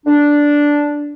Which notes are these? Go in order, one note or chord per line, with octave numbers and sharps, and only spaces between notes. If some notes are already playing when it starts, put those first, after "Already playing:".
D4